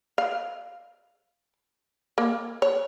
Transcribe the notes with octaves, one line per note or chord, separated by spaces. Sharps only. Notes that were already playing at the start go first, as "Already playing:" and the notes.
F5
A#3
C#5